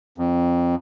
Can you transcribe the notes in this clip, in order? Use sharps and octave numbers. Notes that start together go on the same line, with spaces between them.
F2